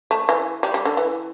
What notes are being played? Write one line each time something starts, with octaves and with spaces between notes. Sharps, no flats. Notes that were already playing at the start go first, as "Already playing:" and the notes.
A3
E3
G3
G3
D3
E3